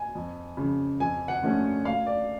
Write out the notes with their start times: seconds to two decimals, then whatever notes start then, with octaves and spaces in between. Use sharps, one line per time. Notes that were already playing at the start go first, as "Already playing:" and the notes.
Already playing: G#5
0.15 F2
0.57 C#3 F3
1.00 F2 G#5
1.28 F#5
1.42 D3 F3 A3 C#4
1.85 D2 F5
2.07 D5